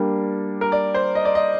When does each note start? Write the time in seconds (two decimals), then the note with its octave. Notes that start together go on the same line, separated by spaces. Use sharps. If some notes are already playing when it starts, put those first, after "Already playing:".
Already playing: G3 A#3 D4
0.61 A#4
0.72 D5
0.94 C5
1.15 D#5
1.25 D5
1.35 D#5